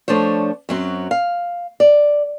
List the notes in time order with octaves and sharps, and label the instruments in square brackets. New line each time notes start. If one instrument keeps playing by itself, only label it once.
[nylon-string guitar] F3 A3 D4 C5 C#5
F#2 F#3 C4
F5
D5